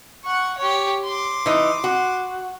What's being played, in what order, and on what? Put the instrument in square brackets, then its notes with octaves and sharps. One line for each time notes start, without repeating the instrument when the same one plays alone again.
[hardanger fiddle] F#5 C#6
G4 C#5
C6 D6
[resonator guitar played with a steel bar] E3 D#4
F#4